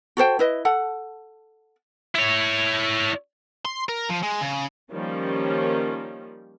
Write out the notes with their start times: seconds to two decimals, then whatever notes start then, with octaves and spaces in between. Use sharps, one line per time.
0.17 F#4 A4 C5 G5
0.39 E4 B4 D#5
0.65 A4 F#5
2.15 E4 C#5
3.65 C6
3.89 A#4
4.09 F3
4.23 G#3
4.42 C#3
4.91 D#3 F3 G3 A#3 C#4